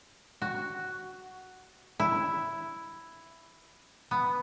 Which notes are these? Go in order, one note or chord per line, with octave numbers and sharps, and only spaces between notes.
F#4
E4
B3